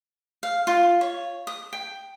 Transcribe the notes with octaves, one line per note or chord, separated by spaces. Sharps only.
F5
F4
C#5
D#6
G5